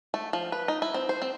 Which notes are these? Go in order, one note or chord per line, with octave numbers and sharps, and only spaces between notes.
A3
F3
B4
D#4
E4
C4
C5
C4